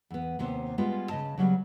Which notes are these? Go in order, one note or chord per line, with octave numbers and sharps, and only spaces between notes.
E2 B3
D#2 C3 B3 C5
G3 G#3 B3 F4
C#3 D#5 A5
C#3 F#3 G3 B3